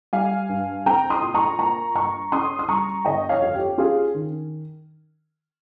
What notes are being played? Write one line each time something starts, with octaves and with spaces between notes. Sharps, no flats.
G3 F5 G#5
G2
C4 G5 A#5
C6 D#6
A#2
A#5 C#6
A#3 A#5 C#6
G2 A#5 C#6
C#4 C6 D#6
D#6
G3 A#5 C#6
G1 D#5 G5
C#5 F5
F2
G4
C#4 F4 G#4
D#3